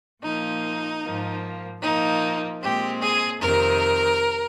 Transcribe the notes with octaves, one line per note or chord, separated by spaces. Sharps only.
A#2 F3 A#3 D#4
G#2 F3 A#3
A#2 F3 A#3 D#4
A#2 G#3 C4 G4
G#4
F2 C3 D#3 A#4